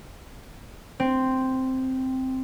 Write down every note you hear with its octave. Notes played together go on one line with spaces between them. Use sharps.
C4